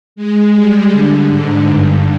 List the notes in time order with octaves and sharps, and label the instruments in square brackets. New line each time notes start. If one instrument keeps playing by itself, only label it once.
[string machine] G#3
G3
D3
G#2
G2